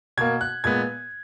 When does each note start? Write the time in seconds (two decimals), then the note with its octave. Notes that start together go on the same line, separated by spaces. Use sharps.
0.17 B2 A#3 G#6
0.41 F#6
0.64 A#2 G#3 B3 G#6